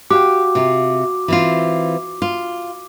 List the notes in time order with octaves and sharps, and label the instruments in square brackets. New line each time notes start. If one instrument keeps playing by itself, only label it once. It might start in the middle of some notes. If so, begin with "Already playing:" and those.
[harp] F#4 F5 G5 [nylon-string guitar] G4 [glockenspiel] D6
[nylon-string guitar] C3 F4
E3 C4 F4
F4